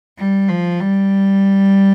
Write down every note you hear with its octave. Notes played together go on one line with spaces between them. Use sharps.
G3
F3
G3